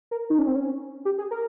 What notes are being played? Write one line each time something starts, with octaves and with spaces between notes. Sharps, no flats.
A#4
D#4
C#4
C4
C#4
G4
G#4
A#4